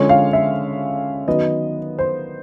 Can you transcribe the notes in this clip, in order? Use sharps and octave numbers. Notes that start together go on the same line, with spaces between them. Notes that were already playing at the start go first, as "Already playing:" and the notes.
Already playing: D3 F3 G#3 C#4 C#5
F5
E5
D#3 F#3 B3 D#5
C5